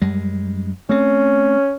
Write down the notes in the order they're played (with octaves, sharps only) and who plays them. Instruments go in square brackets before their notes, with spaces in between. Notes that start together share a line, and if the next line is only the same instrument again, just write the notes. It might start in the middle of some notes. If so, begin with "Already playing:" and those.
[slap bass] F#2 G3 G#3
[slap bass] A3 C4 [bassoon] C#4